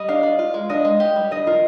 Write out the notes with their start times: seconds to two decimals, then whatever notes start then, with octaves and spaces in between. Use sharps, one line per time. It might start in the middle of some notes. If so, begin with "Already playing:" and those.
Already playing: G3 D#5
0.08 D4 F5
0.23 D5
0.39 F4
0.54 G#3
0.69 D4 D#5
0.85 G#3
1.00 G4
1.16 G3
1.31 D4 D#5
1.47 F4 A#4